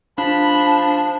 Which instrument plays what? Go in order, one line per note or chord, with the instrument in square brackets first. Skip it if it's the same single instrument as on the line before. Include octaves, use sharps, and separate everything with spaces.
[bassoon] F3 [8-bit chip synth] D4 [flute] A5 [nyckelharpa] B5